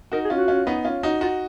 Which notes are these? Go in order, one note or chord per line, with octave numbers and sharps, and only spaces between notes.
D#4 F#4 A#4
G#4
C#4 F4
F#4
C#4 F4
B3 D#4
C#4 F4
D#4 F#4
D#4 F4 F#4